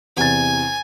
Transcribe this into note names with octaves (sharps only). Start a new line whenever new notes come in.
E2 C3 G#5 A6